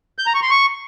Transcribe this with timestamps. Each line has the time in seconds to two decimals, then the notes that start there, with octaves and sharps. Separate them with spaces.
0.19 G6
0.27 A#5
0.35 C#6
0.42 C6
0.50 C#6